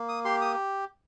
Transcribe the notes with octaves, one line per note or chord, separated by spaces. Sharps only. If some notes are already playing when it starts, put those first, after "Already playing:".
Already playing: A#3
D#6
G4 C6
D#6